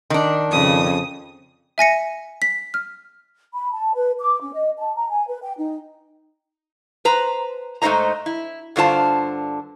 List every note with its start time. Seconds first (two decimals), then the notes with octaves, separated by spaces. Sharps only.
0.10 D#3 D4
0.50 F2 C#3 D#6
1.78 E5 G#5 A#6 C#7
2.42 B6
2.74 F6
3.54 B5
3.72 A5
3.94 B4
4.20 D6
4.41 C#4
4.53 D#5
4.78 A5
4.96 A#5
5.10 G#5
5.27 B4
5.43 G5
5.57 D#4
7.05 B4 C5 A#5
7.82 G#2 A3 D#4 C5 D#5 A#5
8.26 E4
8.76 G2 D3 F4 C5 A5